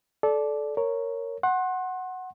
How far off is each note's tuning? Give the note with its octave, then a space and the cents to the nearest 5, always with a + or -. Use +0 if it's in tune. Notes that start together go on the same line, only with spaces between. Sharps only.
A4 -20 D5 -5
A#4 -10 C#5 +0
F#5 +0 C6 +35